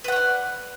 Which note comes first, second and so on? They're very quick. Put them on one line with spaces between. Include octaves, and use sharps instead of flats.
B4 F#5 C#5 D5